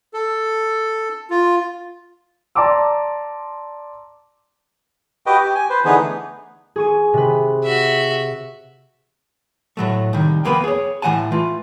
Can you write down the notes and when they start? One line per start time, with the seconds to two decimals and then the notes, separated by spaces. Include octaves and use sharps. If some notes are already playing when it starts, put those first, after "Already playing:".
0.14 A4
1.30 F4
2.55 D5 A5 A#5 C6 D6 E6
5.26 F#4 G4 B4 D#5 G5
5.41 G4
5.55 G#5
5.69 B4 C5
5.85 D3 E3 B3 D#4 G#4 B4
5.99 A3
6.76 G#4 C#6 D#7
7.14 C3 B4
7.64 F#4 E5
9.77 A2 F#3 A3
10.13 C2 D#3
10.45 F2 A#3 B3 B4 G5
10.64 G#4 C#5
11.02 A2 E3 G#3 F#5 G#5 A5
11.32 A3 F4 B4